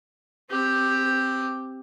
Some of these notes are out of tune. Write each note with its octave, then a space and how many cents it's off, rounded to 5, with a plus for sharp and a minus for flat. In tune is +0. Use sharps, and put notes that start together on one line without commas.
C4 +0 G4 +5